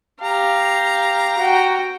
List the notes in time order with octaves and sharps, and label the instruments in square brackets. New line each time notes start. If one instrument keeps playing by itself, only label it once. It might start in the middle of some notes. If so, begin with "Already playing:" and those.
[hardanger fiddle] G4 F5 [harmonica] A#5
[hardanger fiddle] F#4 G5